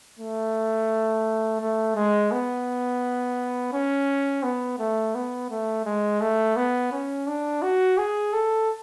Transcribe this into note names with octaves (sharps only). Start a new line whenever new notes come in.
A3
A3
G#3
B3
C#4
B3
A3
B3
A3
G#3
A3
B3
C#4
D4
F#4
G#4
A4